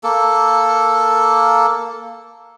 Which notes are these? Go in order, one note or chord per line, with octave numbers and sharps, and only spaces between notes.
A#3 A4